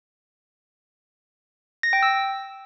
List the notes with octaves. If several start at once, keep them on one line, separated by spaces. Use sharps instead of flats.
A#6
G5
E6